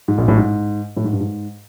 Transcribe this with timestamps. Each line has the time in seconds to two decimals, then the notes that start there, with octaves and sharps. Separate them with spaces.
0.08 G#2
0.18 A#1 A#2
0.28 A1 A2
0.37 G#2
0.97 A2
1.04 G#2
1.13 G2
1.20 G#2